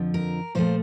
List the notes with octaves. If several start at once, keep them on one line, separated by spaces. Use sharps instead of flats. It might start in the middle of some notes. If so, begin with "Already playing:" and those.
Already playing: F2 D3 F3
A#4
A#2 F3 A3 C5